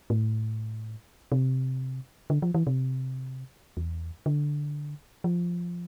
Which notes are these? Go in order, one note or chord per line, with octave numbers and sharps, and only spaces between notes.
A2
C3
D3
F3
E3
C3
E2
D3
F3